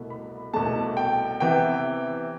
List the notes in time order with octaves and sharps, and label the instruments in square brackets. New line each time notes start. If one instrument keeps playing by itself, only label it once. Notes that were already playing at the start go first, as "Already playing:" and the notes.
Already playing: [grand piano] C2 B2 A3
B5
C2 B2 A3 A5
G5
C3 E3 B3 G5